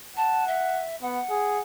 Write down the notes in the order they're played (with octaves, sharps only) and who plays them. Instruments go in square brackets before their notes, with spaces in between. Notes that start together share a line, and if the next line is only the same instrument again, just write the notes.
[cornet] F#5 [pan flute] A5
[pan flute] E5
[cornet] B3 [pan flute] F#5
[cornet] G#4